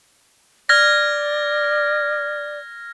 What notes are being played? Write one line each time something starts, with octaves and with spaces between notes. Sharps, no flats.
D5 F6 G#6 A#6